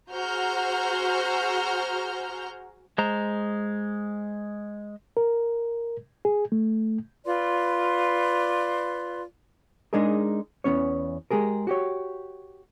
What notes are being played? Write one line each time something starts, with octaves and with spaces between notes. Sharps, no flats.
F#4 G#4 C5 A#5 F6 G6
G#3 C5 A#5
A#4
G#4
A3
F4 B4 D5 C6
G#3 D4 D#4 G#4 A#4
E2 E3 B3 C#4 C#5
G#3 G4 G#4 A#4
F#4 G4 C#5